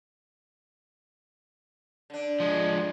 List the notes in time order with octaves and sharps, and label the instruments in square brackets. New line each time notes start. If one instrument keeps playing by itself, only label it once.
[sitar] D3 D4
[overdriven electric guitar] F3 G#3